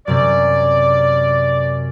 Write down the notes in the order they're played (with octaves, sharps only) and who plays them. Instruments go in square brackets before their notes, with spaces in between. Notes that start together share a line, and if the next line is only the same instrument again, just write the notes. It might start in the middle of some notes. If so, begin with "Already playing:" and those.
[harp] F#2 C3 [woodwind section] D5